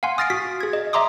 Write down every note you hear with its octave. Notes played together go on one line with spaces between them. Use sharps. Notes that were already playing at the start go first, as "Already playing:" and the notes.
F5 F#5 G#5 C6
D#6 F6 A6 A#6 C7 D7
F#4 B6
G#4 G#6
D#5
D#5 E5 A#5 C6 D6 D#6